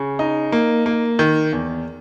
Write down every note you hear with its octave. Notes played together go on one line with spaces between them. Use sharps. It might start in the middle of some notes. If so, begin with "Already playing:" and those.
Already playing: C#3
D#4
A#3
A#3
D#3
E2